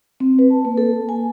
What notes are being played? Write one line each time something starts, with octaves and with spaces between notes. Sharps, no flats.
C4
B4
A5
A#3
A4
G#5